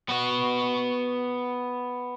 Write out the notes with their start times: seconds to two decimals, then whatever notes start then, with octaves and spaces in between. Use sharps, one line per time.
0.09 B3 F#4